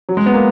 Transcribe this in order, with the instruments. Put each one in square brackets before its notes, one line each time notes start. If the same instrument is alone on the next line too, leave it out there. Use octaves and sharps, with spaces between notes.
[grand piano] F#3
G#3
B3
A#3